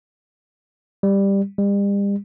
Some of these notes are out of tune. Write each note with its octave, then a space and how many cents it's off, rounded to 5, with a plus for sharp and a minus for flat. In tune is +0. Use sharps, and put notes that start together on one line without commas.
G3 +10
G3 +40